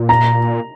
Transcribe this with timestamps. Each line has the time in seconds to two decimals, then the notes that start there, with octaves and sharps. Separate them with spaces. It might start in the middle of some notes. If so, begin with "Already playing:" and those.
Already playing: A#2
0.09 A#5